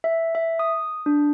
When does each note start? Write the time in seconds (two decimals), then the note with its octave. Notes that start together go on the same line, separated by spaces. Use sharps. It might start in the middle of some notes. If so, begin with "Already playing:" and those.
0.04 E5
0.35 E5
0.59 D#6
1.06 D4